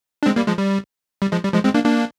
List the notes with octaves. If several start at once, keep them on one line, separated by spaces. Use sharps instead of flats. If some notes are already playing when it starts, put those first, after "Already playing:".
D4
G#3 C4
G3 A#3
F3 G#3
G3
G3
F3 G#3
G3
F3 G#3
G#3 C4
A#3 D4
A#3 D4